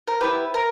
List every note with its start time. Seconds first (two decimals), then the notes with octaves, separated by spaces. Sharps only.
0.07 A#4
0.21 B3 E4 G4 B4
0.54 A#4